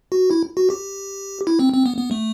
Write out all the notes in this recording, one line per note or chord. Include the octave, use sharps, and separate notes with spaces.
F#4
E4
F#4
G4
E4
C4
C4
B3
B3
A3